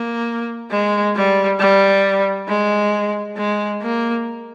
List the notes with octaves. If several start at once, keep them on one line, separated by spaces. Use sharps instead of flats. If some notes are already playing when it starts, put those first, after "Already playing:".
Already playing: A#3
G#3
G3
G3
G#3
G#3
A#3